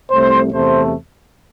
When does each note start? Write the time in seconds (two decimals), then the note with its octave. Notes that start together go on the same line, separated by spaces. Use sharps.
0.11 C2 C3 A3 C5
0.53 E2 C3 A3 C5